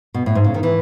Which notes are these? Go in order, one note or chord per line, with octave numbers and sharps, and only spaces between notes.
B2
A2
G#2
C#3
D#3
E3